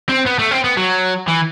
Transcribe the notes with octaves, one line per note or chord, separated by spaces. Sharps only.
C4
B3
A3
C4
B3
F#3
E3